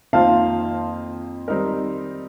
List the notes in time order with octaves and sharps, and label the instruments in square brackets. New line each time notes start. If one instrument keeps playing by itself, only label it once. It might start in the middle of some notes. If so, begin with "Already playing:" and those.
[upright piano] F2 D#3 A#3 F4 C5 [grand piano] F5 A5
[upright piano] D#3 G3 C4 D#4 A#4